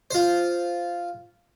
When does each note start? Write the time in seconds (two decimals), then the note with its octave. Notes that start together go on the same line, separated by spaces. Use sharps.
0.11 F4 C5